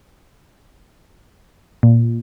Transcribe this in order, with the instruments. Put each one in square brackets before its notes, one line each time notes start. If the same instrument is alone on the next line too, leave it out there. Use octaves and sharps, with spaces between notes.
[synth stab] A#2